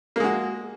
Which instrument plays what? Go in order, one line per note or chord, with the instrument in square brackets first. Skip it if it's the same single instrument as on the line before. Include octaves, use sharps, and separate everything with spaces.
[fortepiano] A#3
G#3
F#4